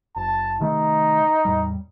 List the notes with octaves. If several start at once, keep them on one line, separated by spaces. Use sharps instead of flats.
F#1 A5
C3 D#3 A3 D#4
E2 A2 G3